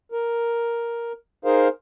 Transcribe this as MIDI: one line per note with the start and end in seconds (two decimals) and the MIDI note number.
0.12 1.12 70
1.45 1.68 63
1.45 1.68 68
1.45 1.68 70
1.45 1.68 72
1.45 1.68 77